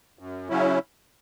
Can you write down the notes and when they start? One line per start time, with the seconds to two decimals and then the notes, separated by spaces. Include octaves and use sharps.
0.19 F#2
0.49 C#3 F#3 C#4 E4